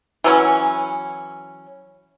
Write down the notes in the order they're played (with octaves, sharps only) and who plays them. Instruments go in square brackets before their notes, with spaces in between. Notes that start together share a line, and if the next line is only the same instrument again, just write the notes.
[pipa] E3 F#3 C#4